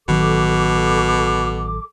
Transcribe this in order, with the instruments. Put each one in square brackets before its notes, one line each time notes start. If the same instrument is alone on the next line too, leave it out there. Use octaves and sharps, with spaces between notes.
[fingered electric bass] A1 D#3 F#3 [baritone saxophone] B2 [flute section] A4 D6